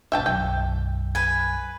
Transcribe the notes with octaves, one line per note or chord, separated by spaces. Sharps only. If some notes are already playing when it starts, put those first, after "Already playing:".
G2 B2 E5 G5 A5
B1 F#2 G5
B4 G#5